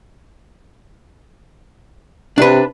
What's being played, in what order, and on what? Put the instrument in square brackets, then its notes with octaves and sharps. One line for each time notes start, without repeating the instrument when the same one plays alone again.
[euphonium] C3 [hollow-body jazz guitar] D4 B4